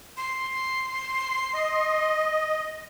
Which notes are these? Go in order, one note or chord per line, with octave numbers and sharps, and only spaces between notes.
C6
D#5